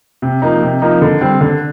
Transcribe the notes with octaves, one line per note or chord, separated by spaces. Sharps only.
C3
F3 A#3 D#4
C3
F3 A#3 D#4
D3
G3 C4
D3